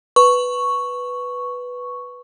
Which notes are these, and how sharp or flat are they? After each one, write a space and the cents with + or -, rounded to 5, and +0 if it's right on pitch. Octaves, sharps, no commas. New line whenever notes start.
B4 +0 C#6 +0